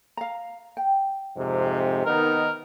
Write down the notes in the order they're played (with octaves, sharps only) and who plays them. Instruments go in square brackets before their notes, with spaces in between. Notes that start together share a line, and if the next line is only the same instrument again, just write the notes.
[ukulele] F5 A#5
G5
[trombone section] F2 G#2 C3
[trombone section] D#3 B3 D#4 [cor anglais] A#4